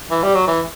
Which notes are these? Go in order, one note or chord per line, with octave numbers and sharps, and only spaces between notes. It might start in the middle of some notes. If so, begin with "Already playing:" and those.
E3
G3
F#3
E3